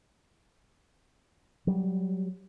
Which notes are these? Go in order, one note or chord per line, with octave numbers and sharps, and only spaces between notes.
F#3 G3